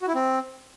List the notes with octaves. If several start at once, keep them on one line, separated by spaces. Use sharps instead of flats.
F#4
E4
C4